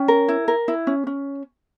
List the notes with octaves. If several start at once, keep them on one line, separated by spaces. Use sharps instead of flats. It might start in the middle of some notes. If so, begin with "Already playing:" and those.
Already playing: C#4 G5
A#4
E4
A#4
E4
C#4
C#4